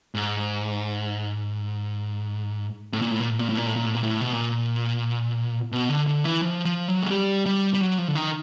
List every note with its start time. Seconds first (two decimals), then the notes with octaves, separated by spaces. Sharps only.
0.15 G#2
2.93 A2
3.02 A#2
3.11 A2
3.20 A#2
3.30 A2
3.39 A#2
3.49 A2
3.57 A#2
3.66 A2
3.76 A#2
3.86 A2
3.94 A#2
4.03 A2
4.21 B2
4.33 A#2
5.72 B2
5.89 D3
6.07 D3
6.24 E3
6.42 F3
6.65 F3
6.88 F#3
7.03 G#3
7.11 G3
7.46 G3
7.74 G3
7.81 F#3
7.98 F3
8.08 D3
8.15 D#3